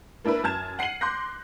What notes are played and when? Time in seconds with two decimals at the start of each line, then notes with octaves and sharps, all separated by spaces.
0.25 A#3 D4 E4 A#4 B4
0.43 F#2 A5 F6 G#6 E7
0.79 F#5 C7 C#7 D#7 F#7
1.01 C6 D6 F#6 G6 A#6